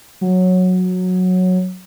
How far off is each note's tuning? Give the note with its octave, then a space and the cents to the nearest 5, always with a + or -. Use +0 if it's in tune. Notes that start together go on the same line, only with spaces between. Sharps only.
F#3 -10